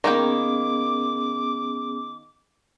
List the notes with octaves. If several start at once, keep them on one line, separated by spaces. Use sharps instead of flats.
D#3 A#3 B3 C#4 G#4 G5 D6